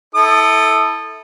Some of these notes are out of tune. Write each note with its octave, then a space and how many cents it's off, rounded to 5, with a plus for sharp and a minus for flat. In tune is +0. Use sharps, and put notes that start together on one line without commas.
E4 -25 A4 +0 D#6 -20